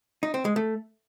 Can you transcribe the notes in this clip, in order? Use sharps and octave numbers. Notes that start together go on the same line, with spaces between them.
D#4
C4
G#3
A3